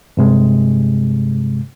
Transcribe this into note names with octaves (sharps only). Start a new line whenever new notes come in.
G2 C3 G#3